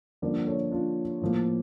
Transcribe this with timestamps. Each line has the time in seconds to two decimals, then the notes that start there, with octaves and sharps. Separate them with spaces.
0.22 G2 D3 F3 A#3 A#4 D5
0.47 A4 C#5
0.71 D4 F4
1.21 A2 F3 A#3